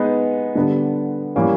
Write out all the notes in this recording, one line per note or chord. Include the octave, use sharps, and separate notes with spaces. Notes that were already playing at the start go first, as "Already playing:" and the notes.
Already playing: G#3 B3 D#4 G#4 B4
D3 G3 B3 D4
E3 G3 A#3 C#4